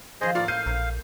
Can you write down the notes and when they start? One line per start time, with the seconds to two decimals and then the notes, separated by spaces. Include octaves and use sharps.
0.21 D#3 F3 G#4 C5 D#5
0.35 A2 A#3 E4 F4 D5 F5
0.48 F5 G6 C7 D#7
0.66 A#1 A#4